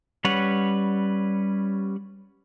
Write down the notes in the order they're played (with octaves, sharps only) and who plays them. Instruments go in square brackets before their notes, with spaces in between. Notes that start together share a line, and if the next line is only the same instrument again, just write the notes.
[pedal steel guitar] G3 C#4 B4 C#5 F#5